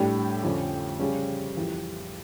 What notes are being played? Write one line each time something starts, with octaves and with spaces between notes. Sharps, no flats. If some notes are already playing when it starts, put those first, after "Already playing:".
Already playing: A2 G3 D4 G4
F2 D3 F3 C#4
C#3 G3 C#4
F2 E3 G3